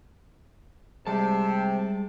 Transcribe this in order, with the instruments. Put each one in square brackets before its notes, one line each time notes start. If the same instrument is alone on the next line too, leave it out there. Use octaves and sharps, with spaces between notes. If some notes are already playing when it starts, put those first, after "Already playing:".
[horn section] C3 [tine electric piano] G3 G#3 G#4 [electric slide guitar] A5